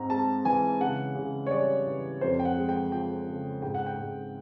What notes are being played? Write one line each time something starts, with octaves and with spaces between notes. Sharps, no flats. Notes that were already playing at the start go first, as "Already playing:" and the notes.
Already playing: G#2 C4 A#5
G#3 A5
E3 G#5
C#3 F#5
C#3
C#5
G3 D5
E3
F2 C5
G5
F#5
G#3
G5
F3 G5
C#3
G#2 G5
F#5
G5
G#2